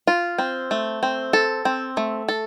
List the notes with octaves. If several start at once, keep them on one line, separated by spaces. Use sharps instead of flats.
F4
C4
A3
C4
A4
C4
A3
A4